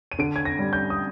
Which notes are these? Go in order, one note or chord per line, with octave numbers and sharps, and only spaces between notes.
D#7
D3 D7
G#6
A#6
G3
G6
D#6